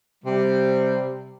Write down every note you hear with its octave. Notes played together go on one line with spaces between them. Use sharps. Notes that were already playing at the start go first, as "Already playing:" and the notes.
C3 G3